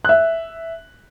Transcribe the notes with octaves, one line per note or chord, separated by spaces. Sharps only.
E5 F#6